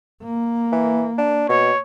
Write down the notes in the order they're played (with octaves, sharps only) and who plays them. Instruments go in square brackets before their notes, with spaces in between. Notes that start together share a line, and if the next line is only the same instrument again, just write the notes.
[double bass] A#3
[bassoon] E3
D4
[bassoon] B2 [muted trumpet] C#5